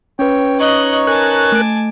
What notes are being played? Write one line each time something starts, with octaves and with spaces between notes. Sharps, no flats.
C#4 B4 C#5 G5
D#4 C#5 D#5 C#6 F#6
A#4 G#5 A5 F#6
A3 D7